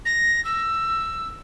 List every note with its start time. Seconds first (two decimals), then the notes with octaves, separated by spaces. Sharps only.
0.05 A#6
0.45 E6